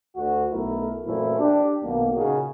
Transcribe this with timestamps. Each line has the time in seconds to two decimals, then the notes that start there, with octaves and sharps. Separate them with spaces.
0.16 D2 F#4
0.51 B1 A3 E4 A#4
1.05 F#2 A#2 E3 A3 C4 E4
1.39 D4 G4
1.83 B1 B2 D#3 A#3
2.15 A#2 C#3 C#4 D#4 F#4 G#4